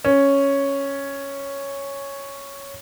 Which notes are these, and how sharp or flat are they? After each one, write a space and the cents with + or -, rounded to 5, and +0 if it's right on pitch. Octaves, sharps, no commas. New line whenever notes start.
C#4 +0